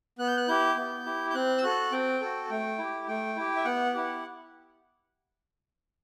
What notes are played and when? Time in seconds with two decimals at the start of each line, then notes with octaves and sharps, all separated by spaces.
0.19 B3 F#6
0.28 G6
0.37 F#6
0.48 E4 G4 G6
0.77 B3
1.06 E4 G4
1.30 G6
1.35 C4 F#6
1.58 E6
1.63 F#4 A4 F#6
1.92 C4 G5
2.21 F#4 A4
2.50 A3 G5
2.78 E4 G4
3.08 A3 G5
3.36 E4 G4
3.56 E5
3.65 B3 F#5
3.94 E4 G4